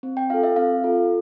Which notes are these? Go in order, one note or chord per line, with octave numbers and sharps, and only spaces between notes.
C4
G5
F4 A4 F5
E5
C4 F5
F4 A4